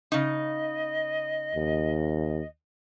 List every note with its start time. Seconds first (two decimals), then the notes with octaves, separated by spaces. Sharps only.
0.12 C#3 D#4 D#5
1.55 D#2